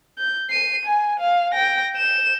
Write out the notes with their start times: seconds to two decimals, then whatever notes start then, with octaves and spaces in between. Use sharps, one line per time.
0.18 G6
0.50 C7 D#7
0.86 G#5
1.20 F5
1.52 G5 A#6
1.96 G6 E7